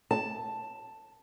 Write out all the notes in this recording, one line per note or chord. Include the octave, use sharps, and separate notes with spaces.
A5